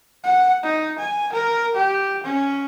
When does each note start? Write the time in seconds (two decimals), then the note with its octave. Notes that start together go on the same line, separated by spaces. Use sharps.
0.23 F#5
0.63 D#4
0.99 G#5
1.33 A#4
1.75 G4
2.24 C#4